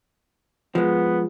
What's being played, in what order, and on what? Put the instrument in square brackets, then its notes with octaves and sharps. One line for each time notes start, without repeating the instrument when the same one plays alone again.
[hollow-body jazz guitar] F3 G#3 [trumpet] B3